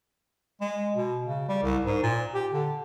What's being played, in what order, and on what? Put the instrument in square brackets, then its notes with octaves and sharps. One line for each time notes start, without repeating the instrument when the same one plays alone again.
[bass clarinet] G#3
B2
C#3
G3
C2
G#2
A#2
G4
D3